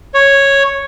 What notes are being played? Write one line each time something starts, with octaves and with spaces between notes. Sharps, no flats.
C#5